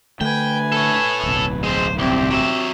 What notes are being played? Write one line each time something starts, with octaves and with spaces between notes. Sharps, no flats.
D3 A3 B4 G5 G#5
A4 C#5
D1 B1
G#3 C4 C5
C2 C4 G4
F#3 E5